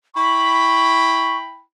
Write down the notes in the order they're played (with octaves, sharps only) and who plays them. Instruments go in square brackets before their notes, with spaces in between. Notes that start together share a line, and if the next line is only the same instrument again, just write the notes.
[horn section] E4 G5 B5 [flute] C#6